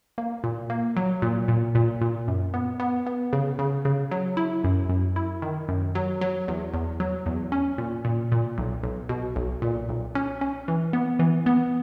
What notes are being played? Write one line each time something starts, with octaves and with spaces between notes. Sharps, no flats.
A#3
A#2
A#3
F#3
A#2
A#2
A#2
A#2
F#2
B3
B3
B3
C#3
C#3
C#3
F#3
E4
F#2
F#2
E4
D#3
F#2
F#3
F#3
E2
E2
F#3
E2
C#4
A#2
A#2
A#2
B1
B1
B2
B1
A#2
B1
C#4
C#4
E3
B3
E3
B3